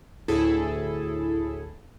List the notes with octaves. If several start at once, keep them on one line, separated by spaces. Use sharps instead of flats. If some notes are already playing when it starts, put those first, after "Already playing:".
D2 A2 E4 G#4 A4